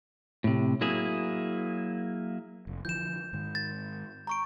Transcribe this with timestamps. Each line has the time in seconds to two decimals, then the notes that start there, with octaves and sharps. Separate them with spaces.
0.44 A2 C3
0.81 F#3 A#3 E4 G#4
2.67 F1
2.85 D3 E3 F3 G6 E7
3.33 G#2 D#3
3.55 A6
4.27 A#5 C#6 D7